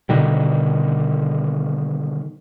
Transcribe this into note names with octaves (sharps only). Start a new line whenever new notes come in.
B2 D3 D#3 G3